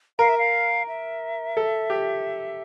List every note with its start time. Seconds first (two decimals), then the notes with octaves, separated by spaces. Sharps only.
0.19 A#4 F5
0.29 E5
0.38 F5
0.88 E5
1.57 A4
1.90 G4